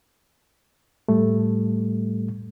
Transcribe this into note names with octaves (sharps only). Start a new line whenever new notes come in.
A2 G3 A3